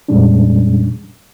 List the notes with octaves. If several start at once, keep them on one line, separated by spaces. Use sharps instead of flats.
F2 A#2 G3 G#3 C#4 D4